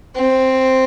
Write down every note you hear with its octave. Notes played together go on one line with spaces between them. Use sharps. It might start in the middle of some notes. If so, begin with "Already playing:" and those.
C4